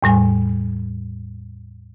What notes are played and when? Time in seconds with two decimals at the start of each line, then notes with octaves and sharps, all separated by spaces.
0.03 E2 A2 G3 G#5